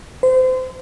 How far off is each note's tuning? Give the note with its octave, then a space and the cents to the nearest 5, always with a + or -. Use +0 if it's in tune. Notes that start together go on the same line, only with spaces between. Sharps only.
C5 -30